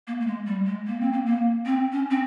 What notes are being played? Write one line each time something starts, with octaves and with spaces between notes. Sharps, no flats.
A#3
A#3
G#3
G3
G#3
A#3
C4
A#3
A#3
C4
C#4
C4